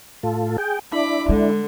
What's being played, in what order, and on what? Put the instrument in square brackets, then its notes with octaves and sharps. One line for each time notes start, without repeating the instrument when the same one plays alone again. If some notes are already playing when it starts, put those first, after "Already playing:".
[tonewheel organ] A2 F4 A4
G#4 G5
[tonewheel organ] D4 E4 [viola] B5 D6
[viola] D3 [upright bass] G#3